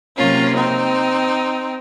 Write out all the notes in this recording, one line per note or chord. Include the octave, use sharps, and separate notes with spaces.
C3 F#3 A#3 C#4 F4
C4 D#4